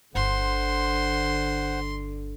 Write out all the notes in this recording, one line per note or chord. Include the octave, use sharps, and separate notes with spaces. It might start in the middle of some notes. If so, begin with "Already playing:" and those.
G1 D3 C5 F#5 C6